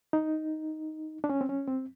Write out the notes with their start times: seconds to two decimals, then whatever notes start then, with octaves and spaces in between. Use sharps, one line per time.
0.13 D#4
1.24 D4
1.30 C#4
1.41 C4
1.49 C#4
1.67 C4